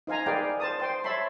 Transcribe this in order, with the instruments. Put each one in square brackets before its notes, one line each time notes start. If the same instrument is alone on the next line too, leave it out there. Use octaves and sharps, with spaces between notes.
[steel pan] D#4 C5 F5 G#5 A#5
G#4 A#4 B4 D5 F5 G5
C5 A5 D#6
C5 G5 C6
C#5 E5 A5 B5 C6